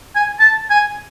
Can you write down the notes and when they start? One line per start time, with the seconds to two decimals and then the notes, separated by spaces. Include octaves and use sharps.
0.15 G#5
0.39 A5
0.70 G#5